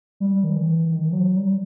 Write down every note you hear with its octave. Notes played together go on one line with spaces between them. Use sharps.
G3
D#3
E3
D#3
E3
F#3
G3